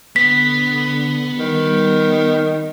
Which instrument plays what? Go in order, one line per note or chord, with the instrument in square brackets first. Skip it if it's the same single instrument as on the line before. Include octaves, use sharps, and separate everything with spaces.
[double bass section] D3 [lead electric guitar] B3 [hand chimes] B6
[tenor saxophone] D#3 [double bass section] G3